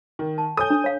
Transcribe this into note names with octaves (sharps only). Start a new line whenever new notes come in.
D#3
A5
A4 C#5 G#5 D#6 G6
D4
C#5 F5